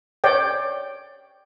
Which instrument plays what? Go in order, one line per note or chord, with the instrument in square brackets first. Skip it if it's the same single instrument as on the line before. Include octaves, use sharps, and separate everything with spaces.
[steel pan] C#5 D5 G5